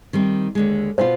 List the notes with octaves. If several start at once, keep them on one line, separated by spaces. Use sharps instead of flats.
D#3 G3 C4
D#2 D3 G#3
B2 B3 F4 C5